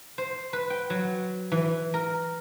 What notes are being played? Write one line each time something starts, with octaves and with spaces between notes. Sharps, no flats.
C5
B4
G5
F#3
E3
A#4